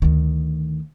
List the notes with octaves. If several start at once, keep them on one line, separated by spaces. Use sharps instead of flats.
D2 D#3